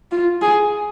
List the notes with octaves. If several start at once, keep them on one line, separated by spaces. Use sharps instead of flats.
F4
G#4